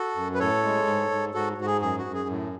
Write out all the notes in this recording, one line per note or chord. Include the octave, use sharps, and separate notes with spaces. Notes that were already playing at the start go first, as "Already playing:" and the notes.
Already playing: F#4 A4
F#2
B4
A2 A4 C#5
G#3
G#2
G#2
G#2 F#4 A4
G#2 F#4
G#4
F#2 G#4
F#4
F#2
G#4
A2